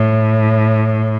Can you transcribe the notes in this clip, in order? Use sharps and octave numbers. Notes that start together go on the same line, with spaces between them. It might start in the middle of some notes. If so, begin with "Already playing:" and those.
Already playing: A2